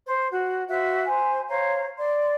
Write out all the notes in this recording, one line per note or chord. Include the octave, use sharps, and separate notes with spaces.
C5
F#4
F#4 C5 E5 F5
C5 G#5
C5 C#5 F5 A#5
D5 C6